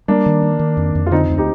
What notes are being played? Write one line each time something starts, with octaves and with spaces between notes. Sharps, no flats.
G3 A#3 D4
D#3
D4
D#3
F2
F2
F4
D3 C4 D#4
D2
D#4 G4